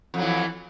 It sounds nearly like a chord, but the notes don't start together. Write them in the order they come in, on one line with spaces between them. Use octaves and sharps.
F2 F#3 E3